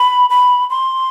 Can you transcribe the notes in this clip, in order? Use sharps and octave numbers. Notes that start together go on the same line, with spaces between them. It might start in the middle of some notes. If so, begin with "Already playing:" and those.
Already playing: B5
B5
C6